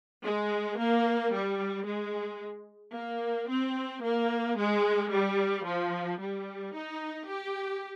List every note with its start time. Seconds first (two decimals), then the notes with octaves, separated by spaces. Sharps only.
0.25 G#3
0.79 A#3
1.33 G3
1.87 G#3
2.95 A#3
3.49 C4
4.03 A#3
4.58 G#3
5.12 G3
5.66 F3
6.21 G3
6.75 D#4
7.28 G4